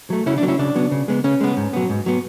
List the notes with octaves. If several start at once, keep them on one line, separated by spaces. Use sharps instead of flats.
F#3 A3
C#3 C#4 E4
D4
F#3 B3
C#4 E4
C#3 D4
F#3 B3
C#3
G#3 B3
C#3 C#4
G#3 B3
G#2
F#3 B3
G#2
F#3 B3